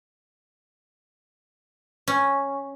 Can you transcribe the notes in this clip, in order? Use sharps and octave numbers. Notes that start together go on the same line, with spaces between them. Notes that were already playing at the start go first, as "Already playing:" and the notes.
C#4